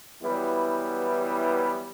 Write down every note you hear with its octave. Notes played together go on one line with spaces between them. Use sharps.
E3 F#3 G3 B3 E4